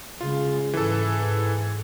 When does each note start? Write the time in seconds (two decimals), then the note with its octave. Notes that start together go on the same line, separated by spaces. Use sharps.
0.21 C#3 G#3 F4
0.73 G#2 E3 A4